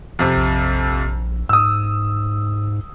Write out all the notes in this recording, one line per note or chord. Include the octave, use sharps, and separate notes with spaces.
F2 C3
A#1
G#2 D#6 E6